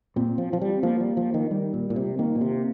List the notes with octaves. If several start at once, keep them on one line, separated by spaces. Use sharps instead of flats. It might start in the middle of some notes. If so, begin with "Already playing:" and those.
A#2 C4
F3
F3
G3
F3 A#3
G3
F3
D#3
D#3 G3
A#2
A#2
C3
D#3 A#3
A#2
C3